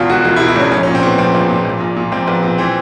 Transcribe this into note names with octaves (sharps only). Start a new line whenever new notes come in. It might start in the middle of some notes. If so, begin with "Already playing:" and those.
Already playing: E2 B2 F4
E1 F#4
E1 F4
E4
B2
E4
E2 C#4
A#1 C#4
C#4
A#2
C4
A#2 B3
A#1 C4
A#1
A#2
A#1
A#2
A#2
A#1 C4
A#1 B3
A#2 C4
E3 C4